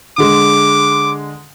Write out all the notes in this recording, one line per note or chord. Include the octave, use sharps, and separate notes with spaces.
D3 G#3 D6